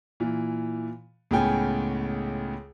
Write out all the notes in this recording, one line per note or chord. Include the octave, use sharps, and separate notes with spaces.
A#2 E3
C#2 A2 C#3 B3 G5 G#5